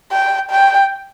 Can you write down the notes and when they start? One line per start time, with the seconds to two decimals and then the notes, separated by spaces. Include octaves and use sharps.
0.12 G5
0.50 G5